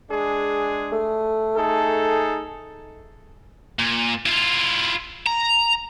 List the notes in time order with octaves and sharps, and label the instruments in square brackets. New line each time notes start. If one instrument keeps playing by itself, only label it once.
[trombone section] G#3 D4 G#4
[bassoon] A3
[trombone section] D#4 G#4 A4
[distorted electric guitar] A#2
E4 F4
A#5